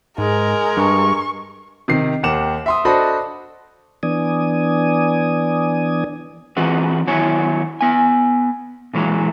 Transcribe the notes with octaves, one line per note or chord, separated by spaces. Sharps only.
G#2 G#3 A#4
G2 C#6
C3 D#3 C7
D#2 G4 A#4 F#5 D6 E7
E5 C6 D#6
D4 F#4 A4 C5 D#5 B5
E3 B3 D4 D5 G#5 D#6
E3 C4 F4 F#4 G#4 B4
D#3 F#3 B3 E4 C#5 G#5
B3 G#5
A#2 E3 F#3 G#3